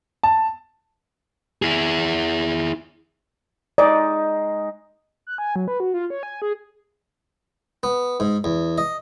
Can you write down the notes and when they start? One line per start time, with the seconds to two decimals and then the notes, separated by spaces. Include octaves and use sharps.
0.23 A5
1.62 E4 G#4
3.78 G#3 D#4 D5
5.27 F#6
5.38 G#5
5.56 F#3
5.68 B4
5.80 F#4
5.94 F4
6.10 C#5
6.23 G#5
6.42 G#4
7.83 B3
8.20 G#2
8.44 E2
8.78 D#5